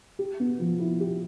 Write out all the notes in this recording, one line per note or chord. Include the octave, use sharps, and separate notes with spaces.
G4
B3
F3
E4
G4